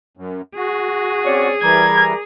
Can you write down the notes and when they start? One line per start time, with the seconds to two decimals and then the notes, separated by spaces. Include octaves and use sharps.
0.17 F#2
0.56 F#4 G#4
1.24 C4 C#4 D5
1.63 E3 G3 A#4 D5 A#5 G#6